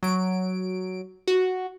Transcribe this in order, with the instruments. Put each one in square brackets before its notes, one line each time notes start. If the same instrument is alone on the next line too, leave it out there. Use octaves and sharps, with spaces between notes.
[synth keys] F#3 D7
F#4